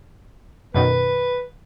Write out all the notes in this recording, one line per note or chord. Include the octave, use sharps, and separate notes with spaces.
F#2 B2 D#3 B4